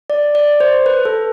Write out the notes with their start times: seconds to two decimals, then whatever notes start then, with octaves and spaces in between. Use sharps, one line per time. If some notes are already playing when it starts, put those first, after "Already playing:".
0.10 D5
0.35 D5
0.60 C5
0.86 B4
1.05 A4